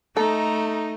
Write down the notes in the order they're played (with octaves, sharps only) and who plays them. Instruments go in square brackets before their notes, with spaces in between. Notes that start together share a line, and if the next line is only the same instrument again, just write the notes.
[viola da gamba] A3 [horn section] D#4 [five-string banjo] A4 [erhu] A#5